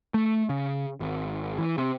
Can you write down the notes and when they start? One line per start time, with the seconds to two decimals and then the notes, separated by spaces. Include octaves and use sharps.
0.14 A3
0.49 C#3
1.00 G#1
1.58 E3
1.78 C3